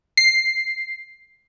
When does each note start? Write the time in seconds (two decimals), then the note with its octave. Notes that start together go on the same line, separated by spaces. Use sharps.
0.17 C7